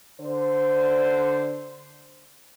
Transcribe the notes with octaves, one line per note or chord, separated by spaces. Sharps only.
D3 C5